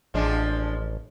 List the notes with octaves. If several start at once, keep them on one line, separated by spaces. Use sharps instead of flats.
A1 F3 G#3 D4